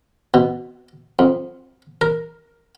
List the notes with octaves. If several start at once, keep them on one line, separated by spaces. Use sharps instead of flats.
B2
F2
A#4